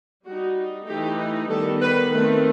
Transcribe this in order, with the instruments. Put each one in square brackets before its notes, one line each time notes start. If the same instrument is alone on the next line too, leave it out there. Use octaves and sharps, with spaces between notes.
[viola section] G3 D#4 F#4
E3 A3 D#4 G4
D#3 G3 B3 A4
B4
D#3 A3 C4 B4